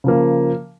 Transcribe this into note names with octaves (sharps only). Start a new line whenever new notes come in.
C#3 F3 A#3